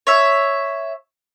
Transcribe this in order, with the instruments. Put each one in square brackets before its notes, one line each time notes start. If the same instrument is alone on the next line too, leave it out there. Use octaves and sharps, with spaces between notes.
[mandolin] C#5 E5